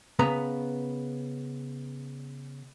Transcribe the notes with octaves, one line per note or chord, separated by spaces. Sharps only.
C#3 B3 B4 A#5